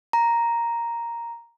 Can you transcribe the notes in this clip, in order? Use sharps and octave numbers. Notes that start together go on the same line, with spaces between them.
A#5